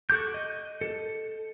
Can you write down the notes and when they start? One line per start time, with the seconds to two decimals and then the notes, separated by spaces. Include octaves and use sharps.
0.10 F#4 A4 D6 G6
0.34 D#5
0.81 A4